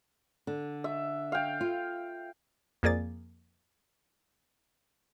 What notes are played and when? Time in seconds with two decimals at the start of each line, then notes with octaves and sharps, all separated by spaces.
0.47 D3
0.84 E5
1.32 F5 G5
1.61 F4
2.83 F2 A#3 G#4 D5 A6